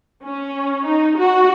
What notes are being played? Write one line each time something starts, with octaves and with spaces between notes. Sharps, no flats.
C#4
D#4
F#4